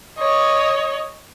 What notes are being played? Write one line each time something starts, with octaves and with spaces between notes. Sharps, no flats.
C#5 D#5